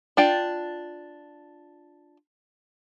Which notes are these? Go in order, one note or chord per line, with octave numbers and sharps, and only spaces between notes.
D4 F4 G5